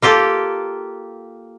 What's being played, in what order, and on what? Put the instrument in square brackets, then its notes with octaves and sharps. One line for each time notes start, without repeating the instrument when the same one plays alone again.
[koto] A#3 F4 G4 A4